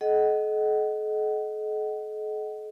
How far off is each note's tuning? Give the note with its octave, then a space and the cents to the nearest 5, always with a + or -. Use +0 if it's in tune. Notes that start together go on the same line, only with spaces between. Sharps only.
A4 -45 D#5 +0 F#5 +25